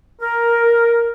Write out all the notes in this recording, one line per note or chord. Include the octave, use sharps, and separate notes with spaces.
A#4